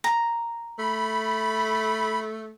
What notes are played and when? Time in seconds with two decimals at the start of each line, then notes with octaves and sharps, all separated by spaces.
0.04 A#5
0.79 A3 B5